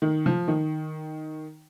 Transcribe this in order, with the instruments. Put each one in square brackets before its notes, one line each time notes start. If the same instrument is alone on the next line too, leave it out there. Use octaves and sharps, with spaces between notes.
[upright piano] D#3
F3
D#3